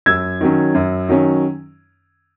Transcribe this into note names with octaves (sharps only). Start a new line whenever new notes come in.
F#2 E6 G#6
D#3 F#3 C#4
F#2
D#3 F#3 C#4